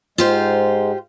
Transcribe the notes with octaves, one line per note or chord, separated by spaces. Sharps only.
G#2 G#3 F4 G4 C5